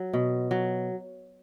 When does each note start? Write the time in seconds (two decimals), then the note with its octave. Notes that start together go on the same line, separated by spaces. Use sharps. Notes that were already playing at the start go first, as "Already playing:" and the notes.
Already playing: F#3
0.13 B2
0.51 F#3